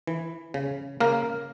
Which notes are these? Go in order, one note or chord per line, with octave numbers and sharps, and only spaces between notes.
E3
C#3
C#3 A#3 A#4